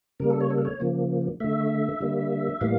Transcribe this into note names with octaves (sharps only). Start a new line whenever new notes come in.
C#3 G3 A#3 A#4
A4
C#5
A4
A#4
C#5
C#3 F3 A#3
D3 A3 E5
D3 G3 A#3
A2 E3 G3 A#3 F5